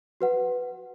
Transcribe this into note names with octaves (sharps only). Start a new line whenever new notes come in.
F#4 B4 F#5